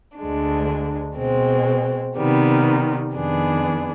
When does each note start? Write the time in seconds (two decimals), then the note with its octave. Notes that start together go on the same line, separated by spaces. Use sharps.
0.19 D2 D3 G#3 D4
1.16 B2 G#3 C4
2.16 C3 D#3 G3 B3
3.13 F2 D#3 B3 D4 G#4